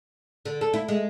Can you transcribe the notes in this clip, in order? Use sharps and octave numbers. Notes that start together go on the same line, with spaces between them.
D3
A4
E4
G#3